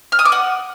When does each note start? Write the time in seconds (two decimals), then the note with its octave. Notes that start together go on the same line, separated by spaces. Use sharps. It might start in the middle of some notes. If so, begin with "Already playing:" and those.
0.12 F6
0.19 D#6
0.25 D6
0.32 F#5